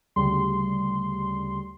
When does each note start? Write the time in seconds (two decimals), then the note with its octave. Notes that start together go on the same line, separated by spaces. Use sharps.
0.16 D2 C#3 G3 C6